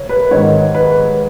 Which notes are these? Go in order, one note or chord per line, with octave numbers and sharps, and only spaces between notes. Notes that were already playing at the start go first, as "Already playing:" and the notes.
Already playing: C#5
B4
G#2 D#3 C#5
B4